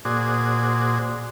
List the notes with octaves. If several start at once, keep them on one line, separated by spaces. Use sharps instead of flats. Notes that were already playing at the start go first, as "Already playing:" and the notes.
A#2 F#4 G#4 C5 D5 D#6